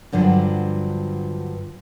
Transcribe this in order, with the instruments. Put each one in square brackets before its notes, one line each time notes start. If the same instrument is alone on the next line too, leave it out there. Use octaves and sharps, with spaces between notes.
[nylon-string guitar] G2 D3 F3 F#3